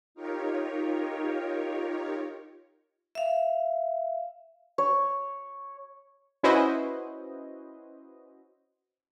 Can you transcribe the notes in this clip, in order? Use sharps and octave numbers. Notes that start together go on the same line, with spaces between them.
D#4 F4 G4 A#4 C#5
E5 F5
C#5
C#4 E4 F#4 B4 C5 D#5